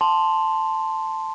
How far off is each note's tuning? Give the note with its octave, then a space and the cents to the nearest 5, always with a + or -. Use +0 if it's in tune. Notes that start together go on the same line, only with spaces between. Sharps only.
A5 +0 C6 +0